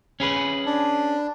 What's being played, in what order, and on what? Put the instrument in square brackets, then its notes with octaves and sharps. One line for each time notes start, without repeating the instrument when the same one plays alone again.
[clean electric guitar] C#4 G#4 B4
[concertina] D4